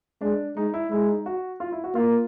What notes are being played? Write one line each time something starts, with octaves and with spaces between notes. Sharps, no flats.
G#3 D4
G#3 D#4
E4
G#3 E4
D#4
F#4
F4
E4
F#4
A#3 F4